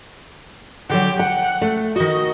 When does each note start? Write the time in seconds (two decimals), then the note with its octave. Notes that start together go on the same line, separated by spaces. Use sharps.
0.90 D3 F#3 G4
1.19 F#5 G5
1.61 A3
1.96 D#3 F#4 D#5